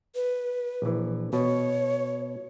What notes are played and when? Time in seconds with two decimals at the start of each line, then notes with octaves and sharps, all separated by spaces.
0.15 B4
0.82 A#1 E3
1.33 B2 C#5